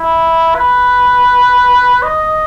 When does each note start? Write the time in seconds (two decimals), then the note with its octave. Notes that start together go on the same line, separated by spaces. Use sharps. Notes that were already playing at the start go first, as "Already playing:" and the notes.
Already playing: E4
0.55 B4
2.02 D#5